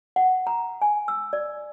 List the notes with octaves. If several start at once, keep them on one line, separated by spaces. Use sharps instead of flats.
F#5
A#5
G#5
E6
D5